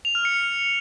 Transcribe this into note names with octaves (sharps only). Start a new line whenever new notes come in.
F7
F6
C#7